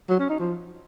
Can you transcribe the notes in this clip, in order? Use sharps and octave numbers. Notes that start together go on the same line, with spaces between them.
F#3
C#4
D#4
F3